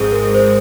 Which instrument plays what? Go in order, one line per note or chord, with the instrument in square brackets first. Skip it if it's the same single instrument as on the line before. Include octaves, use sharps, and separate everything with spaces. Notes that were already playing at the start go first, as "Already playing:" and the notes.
Already playing: [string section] G#1 G#2 F3 G#3 C4 [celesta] G#4
[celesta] A#4
C5